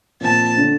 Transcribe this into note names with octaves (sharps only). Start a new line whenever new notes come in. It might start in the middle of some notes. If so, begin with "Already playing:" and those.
A#2 F3 C4 A5
D3 A3 D4